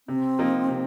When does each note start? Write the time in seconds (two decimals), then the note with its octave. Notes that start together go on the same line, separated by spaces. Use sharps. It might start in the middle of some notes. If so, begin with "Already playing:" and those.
0.08 C3 C4
0.39 F3 A#3 D#4
0.68 C3